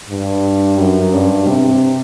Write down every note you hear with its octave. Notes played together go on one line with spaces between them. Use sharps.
G2
F#2
G2
C3